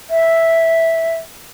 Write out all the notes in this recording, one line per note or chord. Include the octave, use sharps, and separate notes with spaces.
E5